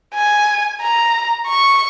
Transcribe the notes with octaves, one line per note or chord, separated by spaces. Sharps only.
G#5
A#5
C#6